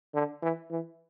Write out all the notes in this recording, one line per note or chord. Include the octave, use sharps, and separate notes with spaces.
D3
E3
E3